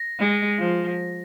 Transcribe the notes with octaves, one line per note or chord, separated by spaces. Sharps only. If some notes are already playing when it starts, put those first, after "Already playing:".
Already playing: A#6
G#3
F3